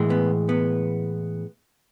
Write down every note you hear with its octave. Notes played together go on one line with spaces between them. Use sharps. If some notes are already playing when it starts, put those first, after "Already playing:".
Already playing: A2 E3 G#3
B3
B3